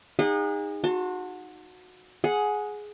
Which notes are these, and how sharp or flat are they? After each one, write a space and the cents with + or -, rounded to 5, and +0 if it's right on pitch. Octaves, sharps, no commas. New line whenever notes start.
D#4 +0 G#4 -35 F#5 -30
F#4 -20 A5 +25 C6 +15
G#4 +10 F#5 -10